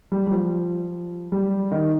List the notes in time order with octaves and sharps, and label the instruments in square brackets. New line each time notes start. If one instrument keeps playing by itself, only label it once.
[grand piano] G3
G3
F3
G3
D#3